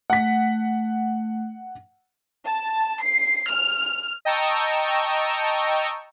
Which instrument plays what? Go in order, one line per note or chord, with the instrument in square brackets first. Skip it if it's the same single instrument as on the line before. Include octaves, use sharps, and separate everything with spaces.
[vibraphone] A3 [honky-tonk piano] F#5 B6
[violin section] A5
C7
F6
[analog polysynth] D#5 G5 A5 A#5 C#6 E6